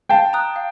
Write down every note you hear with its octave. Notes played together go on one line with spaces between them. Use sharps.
F5 G5 A5
A#5 D#6 F#6
F5